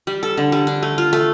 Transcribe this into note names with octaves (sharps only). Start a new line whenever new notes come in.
G3
A4
D3
G3
D4
A3
F4
A3